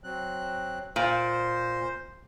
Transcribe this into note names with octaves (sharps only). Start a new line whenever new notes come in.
F#3 C4 F#6
A#2 C5